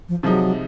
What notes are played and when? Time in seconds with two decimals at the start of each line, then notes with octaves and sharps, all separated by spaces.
0.09 F3
0.23 C3 F3 F#3 G#3 D#4